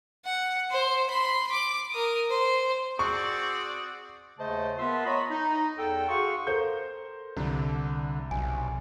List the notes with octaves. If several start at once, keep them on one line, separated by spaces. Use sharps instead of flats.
F#5
C5
B5 C6
D6
A#4 D#6
C5
C4 F#4 G#4 D5 C#6
D#2 C#3 A3 C5 D#5 A5
B3 F4 A#4 E5 A5 C6
C#5 D#5 A#5 B5
D#4
E2 A4 G5
F#4 G#4 F5 C6 C#6
A4 A#4 C5 G6
C2 D3
B1 G#5